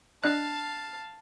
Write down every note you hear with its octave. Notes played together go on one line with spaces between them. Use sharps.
D4 D#5 F5 A5 F#6